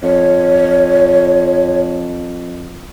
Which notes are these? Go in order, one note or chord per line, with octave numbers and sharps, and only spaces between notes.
F2 C#5